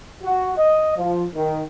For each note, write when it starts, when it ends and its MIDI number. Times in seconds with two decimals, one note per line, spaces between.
0.23 0.53 66
0.57 0.94 75
0.97 1.23 53
1.35 1.62 51